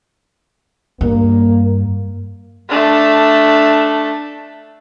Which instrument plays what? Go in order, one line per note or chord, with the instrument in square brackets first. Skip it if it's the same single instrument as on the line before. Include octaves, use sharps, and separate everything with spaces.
[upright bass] G2 [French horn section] A#3
[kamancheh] A3 D4